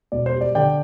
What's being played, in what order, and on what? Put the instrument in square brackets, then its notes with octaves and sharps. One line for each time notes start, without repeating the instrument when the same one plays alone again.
[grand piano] E1 D5
C5
G3
D5
D3 D5 G5